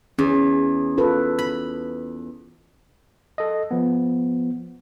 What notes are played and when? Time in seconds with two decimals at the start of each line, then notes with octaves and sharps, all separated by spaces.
0.19 E2 C#4
0.97 F4 A4 B4
1.39 B5
3.38 A4 D#5
3.71 F3 B3